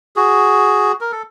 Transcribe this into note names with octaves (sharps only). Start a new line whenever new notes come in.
F#4 G#4
A#4
A4